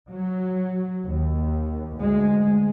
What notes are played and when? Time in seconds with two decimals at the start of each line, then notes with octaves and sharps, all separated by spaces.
0.10 F#3
1.04 D#2
1.96 D2 G#3